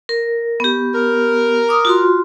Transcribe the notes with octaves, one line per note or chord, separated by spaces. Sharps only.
A#4
B3 G4
A#4
D6 D#6
F4 F#4 C6